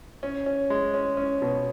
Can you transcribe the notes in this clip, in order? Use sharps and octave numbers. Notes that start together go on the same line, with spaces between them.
C#4
C#4
G#3
C#4
C#4
B2